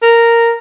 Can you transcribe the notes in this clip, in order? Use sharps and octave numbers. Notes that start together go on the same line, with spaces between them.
A#4